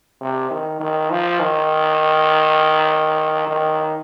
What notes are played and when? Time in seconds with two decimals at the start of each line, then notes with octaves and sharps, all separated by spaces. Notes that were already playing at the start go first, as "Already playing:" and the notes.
0.21 C3
0.50 D#3
0.80 D#3
1.10 F3
1.40 D#3
3.48 D#3